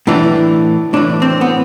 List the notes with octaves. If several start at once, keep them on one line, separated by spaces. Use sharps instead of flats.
A2 E3 D4
A2 E3 D4
C4
B3